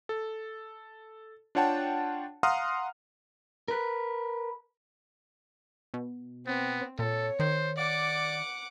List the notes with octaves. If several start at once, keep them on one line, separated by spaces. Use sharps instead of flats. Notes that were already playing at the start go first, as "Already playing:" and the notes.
A4
D4 F4 C#5 F#5 G5 A5
F5 F#5 A#5 C6 D#6 F6
A#4 B4
B2
B3 C4
A#2 A4 C#5
D#3 C5
D5 F#5 D6